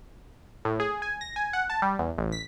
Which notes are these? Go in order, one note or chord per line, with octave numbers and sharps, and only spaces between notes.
A2
G#4
G#5
A#6
G#5
F#5
A5
G3
E2
A1
B6